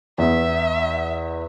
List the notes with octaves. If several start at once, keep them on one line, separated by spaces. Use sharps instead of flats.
E2 B3 E5